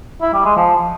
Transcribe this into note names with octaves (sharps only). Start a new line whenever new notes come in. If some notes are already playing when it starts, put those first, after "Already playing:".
E4
G3
G#3
F3